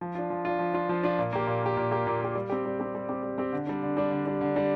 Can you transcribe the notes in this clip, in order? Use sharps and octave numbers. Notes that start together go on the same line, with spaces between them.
F3
D4 F4
F3
D4 F4
F3
D4 F4
F3
D4 F4
A#2
A#3 G4
A#2
A#3 G4
A#2
A#3 G4
A#2
A#3 G4
G3
C4 G4
G3
C4 G4
G3
C4 G4
G3
C4 G4
D3
G3 D4
D3
G3 D4
D3
G3 D4
D3
G3 D4